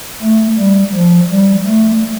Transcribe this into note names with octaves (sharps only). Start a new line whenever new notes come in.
A3
G3
F3
G3
A3